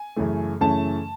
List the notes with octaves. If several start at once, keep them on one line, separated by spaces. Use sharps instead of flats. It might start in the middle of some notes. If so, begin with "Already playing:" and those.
Already playing: G#5
F#2 C#3 E3 A3
F#2 C#3 E3 A3 C#4 A5